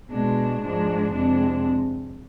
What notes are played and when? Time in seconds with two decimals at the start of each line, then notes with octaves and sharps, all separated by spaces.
0.10 B2 G#3 D4
0.62 G#2 F3 G#3 D4
1.12 F2 C3 G#3 D4